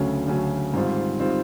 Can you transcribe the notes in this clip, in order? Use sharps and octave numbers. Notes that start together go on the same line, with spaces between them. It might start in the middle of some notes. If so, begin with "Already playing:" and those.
Already playing: D2 C#3 F#3 A3 C#4
D2 C#3 F#3 A3 C#4
G#2 D#3 G3 C4 F4
D#3 G3 C4 F4